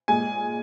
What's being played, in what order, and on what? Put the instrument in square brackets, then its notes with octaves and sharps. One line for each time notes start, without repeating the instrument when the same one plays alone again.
[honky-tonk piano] A#2 G#3 G#5